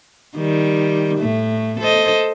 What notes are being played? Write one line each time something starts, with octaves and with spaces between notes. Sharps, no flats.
D#3 G3
A2 A3
A4 C5 D#5